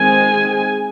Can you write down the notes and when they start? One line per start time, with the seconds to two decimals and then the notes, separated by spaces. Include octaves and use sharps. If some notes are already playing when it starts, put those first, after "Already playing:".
Already playing: D#3 G#3 C4 G#4 G#5